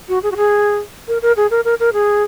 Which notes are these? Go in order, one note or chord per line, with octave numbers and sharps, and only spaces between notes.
F#4
G#4
F#4
G#4
A#4
A#4
G#4
A#4
A#4
A#4
G#4